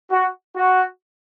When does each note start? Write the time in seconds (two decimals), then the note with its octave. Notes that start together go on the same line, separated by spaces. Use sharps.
0.11 F#4
0.56 F#4